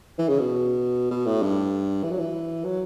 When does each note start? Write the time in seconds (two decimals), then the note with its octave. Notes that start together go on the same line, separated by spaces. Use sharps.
0.19 E3
0.29 C#3
0.40 B2
1.11 B2
1.26 A2
1.42 G2
2.03 E3
2.11 F#3
2.19 E3
2.64 F#3